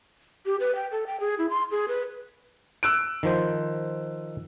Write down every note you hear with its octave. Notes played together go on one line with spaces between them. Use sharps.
G4
B4
G5
A4
G5
G#4
E4
C6
G#4
B4
E6 F#6 D7
D#3 F3 C5